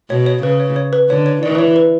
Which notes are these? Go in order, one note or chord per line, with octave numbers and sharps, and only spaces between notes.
B2 C#5
C#5
C#3 B4
C#5
C#5
B4
D3 C#5
C#5
E3 D5
B4
C#5
B4